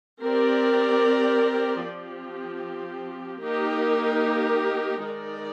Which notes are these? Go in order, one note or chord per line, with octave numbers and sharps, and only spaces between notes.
C4 G4 A#4 D5
F3 C4 G4
A#3 D#4 G4 A#4
D#3 G#3 D#4 A#4 D5